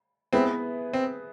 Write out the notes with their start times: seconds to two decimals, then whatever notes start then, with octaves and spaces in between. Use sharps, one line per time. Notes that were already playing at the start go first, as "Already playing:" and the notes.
0.33 B3 C4 E4 G#4 B4
0.93 C4